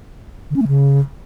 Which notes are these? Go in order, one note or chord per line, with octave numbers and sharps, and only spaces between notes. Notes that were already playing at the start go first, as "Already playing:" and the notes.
D3
C#4
A3
C#3